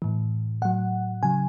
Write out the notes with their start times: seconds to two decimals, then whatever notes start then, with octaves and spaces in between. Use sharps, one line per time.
0.02 A2 E3
0.62 A2 F#3 F#5
1.23 C#3 F#3 G#5